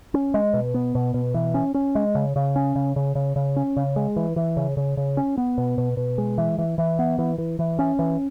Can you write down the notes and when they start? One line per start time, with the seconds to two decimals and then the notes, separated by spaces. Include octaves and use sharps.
0.14 C#4
0.34 G#3
0.54 B2
0.74 B3
0.95 B2
1.14 B2
1.34 E3
1.54 C#4
1.74 C#4
1.95 G#3
2.15 C#3
2.36 C#3
2.56 C#4
2.76 C#3
2.96 C#3
3.15 C#3
3.36 C#3
3.56 C#4
3.77 C#3
3.96 G#3
4.16 E3
4.36 E3
4.57 C#3
4.77 C#3
4.97 C#3
5.17 C#4
5.38 B3
5.58 B2
5.78 B2
5.97 B2
6.18 G#3
6.38 E3
6.58 E3
6.78 E3
6.99 B3
7.19 E3
7.38 E3
7.59 E3
7.79 C#4
7.99 E3